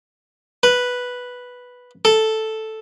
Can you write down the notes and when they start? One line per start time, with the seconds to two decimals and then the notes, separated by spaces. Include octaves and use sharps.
0.63 B4
2.05 A4